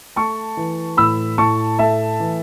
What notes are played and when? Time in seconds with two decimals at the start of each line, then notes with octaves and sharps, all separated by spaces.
0.16 A3 A5 C#6
0.57 E3
0.97 A2 B5 E6
1.38 A2 A5 C#6
1.79 A3 E5 A5
2.20 E3